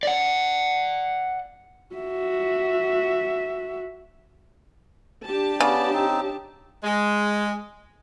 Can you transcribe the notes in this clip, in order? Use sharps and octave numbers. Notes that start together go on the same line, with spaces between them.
D5 F#5
F#4 E5
D4 G4 A5
C#3 B3 D5
C4 D#4
G#3